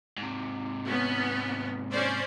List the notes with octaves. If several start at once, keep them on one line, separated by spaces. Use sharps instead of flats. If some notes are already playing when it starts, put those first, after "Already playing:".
G#2 C3
B3 C#4
C#4 C5 D5